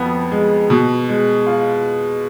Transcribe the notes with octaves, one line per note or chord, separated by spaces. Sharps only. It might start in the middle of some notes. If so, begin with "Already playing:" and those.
Already playing: F2 F3 B3
G#3
B2
G#3
F4